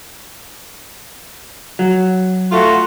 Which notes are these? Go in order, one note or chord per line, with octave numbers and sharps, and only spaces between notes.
F#3
A3 F4 F#4